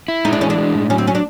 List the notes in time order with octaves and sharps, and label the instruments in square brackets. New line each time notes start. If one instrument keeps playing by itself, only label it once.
[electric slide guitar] E4
[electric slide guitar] G#3 [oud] D#4
[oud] D4
[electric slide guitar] E3 [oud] C#4
[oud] D4
[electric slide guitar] G#3
A2
[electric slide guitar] F#3 [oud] C#4
[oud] C4
C#4
D4